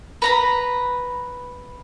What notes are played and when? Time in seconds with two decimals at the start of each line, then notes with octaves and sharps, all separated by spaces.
0.22 B4 A#5 B5